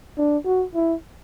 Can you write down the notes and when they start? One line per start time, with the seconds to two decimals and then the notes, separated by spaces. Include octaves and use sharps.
0.18 D4
0.45 F#4
0.74 E4